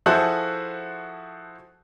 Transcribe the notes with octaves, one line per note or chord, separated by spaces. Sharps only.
F3 E4 F#4 G#4 A4 C5